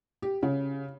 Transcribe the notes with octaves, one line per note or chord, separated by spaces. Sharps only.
G4
C#3